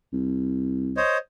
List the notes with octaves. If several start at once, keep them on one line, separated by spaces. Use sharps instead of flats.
C2
C5 C#5 D#5